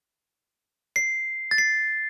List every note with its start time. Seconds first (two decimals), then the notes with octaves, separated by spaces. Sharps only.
0.96 C7
1.51 A6
1.58 C7